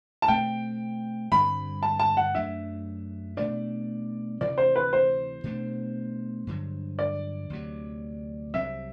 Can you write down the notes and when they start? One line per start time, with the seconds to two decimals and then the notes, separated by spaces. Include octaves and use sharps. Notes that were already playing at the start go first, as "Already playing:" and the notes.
0.22 A5
0.28 B2 A3 C4 G5
1.31 G2 D3 G3 C4 B5
1.83 A5
2.00 A5
2.17 F#5
2.35 F#2 F#3 A3 D4 E5
3.37 B2 A3 D4 D5
4.41 D2 C3 E3 D5
4.58 C5
4.76 B4
4.93 C5
5.44 B2 A3 D4
6.47 G2 D3 F#3
6.99 D5
7.50 D2 C3 F#3
8.54 C2 C3 F#3 C4 E5